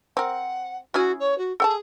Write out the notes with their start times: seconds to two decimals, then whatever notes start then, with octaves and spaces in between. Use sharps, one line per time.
0.17 C4 A#4 F#5
0.94 C#4 E4 F#4 G#4
1.20 C#5
1.38 F#4
1.60 G#4 A4 G5 A5